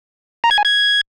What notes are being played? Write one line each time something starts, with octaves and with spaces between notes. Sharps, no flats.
A#5
G#6
G#5
G#6